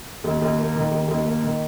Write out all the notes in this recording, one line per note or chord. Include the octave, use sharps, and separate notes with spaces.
D#2
D#2
A#3
D#3
D#2
D#2
A#3
D#3